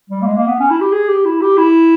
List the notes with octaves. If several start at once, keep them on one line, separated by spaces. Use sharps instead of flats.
G3
A#3
G#3
A#3
B3
C#4
E4
G4
G#4
G4
E4
G4
E4